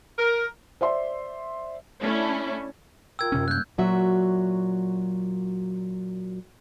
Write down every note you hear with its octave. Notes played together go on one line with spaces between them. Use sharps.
A#4
C5 D5 E5 C6
A3 C#4 D4 E4
F4 A#4 G5 E6 G#6
F#2 C3 C#4
G3 A#3 F#6 G6
A#2 F#3 F#4 E5